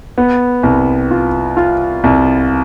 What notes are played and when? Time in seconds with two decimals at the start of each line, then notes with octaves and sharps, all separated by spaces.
0.18 B3
0.63 C2
1.11 F4
1.57 F4
2.04 C2